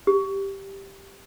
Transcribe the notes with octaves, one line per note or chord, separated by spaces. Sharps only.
G4